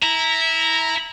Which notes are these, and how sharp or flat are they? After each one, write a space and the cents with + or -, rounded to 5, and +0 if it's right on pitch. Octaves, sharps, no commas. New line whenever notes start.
E4 -15 A#5 +0